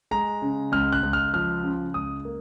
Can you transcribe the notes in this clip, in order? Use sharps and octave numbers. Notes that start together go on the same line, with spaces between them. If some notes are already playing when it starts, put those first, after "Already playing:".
G#3 A#5
C#3
C#2 F6
F#6
C#2
F6
F3 F6
C#3
C#2 D#6
A#3